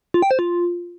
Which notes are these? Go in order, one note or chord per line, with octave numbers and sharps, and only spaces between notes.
F4
G5
C5
F4